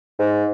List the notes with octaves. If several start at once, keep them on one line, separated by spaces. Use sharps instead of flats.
G#2